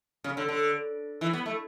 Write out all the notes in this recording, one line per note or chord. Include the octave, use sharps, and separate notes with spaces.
C#3
D3
D3
E3
B3
A3